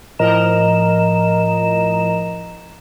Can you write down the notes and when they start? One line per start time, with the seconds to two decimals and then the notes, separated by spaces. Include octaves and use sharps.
0.19 A2 F3 A#4 D#5 A#5 E7